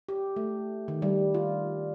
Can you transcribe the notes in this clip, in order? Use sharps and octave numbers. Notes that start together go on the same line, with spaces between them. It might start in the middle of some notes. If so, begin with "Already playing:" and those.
G4
A3
D#3
G3
F4